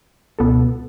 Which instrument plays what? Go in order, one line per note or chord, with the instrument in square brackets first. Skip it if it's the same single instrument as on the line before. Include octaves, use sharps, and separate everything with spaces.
[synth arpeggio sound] C#2 B2 B3 A4